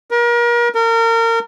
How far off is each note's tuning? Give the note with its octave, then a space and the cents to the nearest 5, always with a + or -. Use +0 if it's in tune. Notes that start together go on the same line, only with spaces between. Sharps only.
A#4 +35
A#4 -30